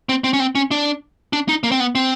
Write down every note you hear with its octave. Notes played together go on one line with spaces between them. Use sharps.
C4
C4
C#4
C4
C#4
D4
D4
D#4
A#3
C4
B3
C4